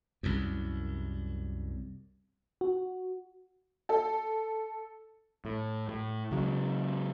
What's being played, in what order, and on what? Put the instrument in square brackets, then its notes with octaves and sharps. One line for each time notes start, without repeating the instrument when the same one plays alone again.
[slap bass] C2 F#2
[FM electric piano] F#4
[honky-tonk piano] A4
[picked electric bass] A2
A2
C#3 F#3 G#3